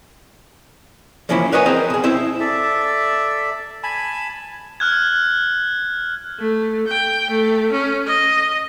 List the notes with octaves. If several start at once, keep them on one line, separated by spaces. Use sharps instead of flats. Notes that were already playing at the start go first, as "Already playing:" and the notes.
E3 F3 A#3 C#4 E4
A#4 B4 C#5 D#5 F#5 G#5
C4 G#4 A#4 C5 D#5 G5
B2 G#4
C4 E4 E5
A4 D5 E5
G#5 A5 B5
F6 F#6 G#6
A3
G5
A3
C#4
D#5